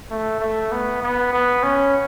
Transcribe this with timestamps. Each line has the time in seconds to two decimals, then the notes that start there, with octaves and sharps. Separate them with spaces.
0.10 A3
0.40 A3
0.72 B3
1.03 B3
1.33 B3
1.63 C#4